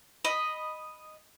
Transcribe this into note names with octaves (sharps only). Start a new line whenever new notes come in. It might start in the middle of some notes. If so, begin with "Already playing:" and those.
D#5 B5